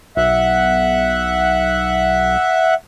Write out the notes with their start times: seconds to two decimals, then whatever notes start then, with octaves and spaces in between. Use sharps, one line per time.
0.17 B1 E5 F#5